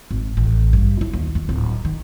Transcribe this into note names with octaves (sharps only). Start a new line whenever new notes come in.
G#1
A1
G2
E4
D#2
D#2
D1
D#3